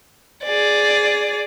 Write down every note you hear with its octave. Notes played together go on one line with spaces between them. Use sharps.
G#4 D5